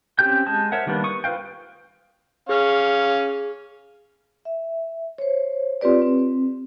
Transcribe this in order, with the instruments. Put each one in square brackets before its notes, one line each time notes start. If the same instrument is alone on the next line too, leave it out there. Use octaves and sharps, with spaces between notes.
[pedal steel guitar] C4 C#4 G4 G5 G6
G#3 A5 D#6 G6
A#4 C5 C#5 E5 F#5
D#3 G3 A#3 B3 D4
C#6 D#6
F4 B4 C5 F5 G5
[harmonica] C#4 C#5 F5 [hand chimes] G#4 F6
[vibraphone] E5
C5 C#5
C4 F4 G4 B4 D5
C4